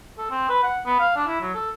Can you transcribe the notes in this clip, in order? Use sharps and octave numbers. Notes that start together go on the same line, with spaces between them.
A4
C4
B4
F#5
B3
F5
D4
E4
F#3
A4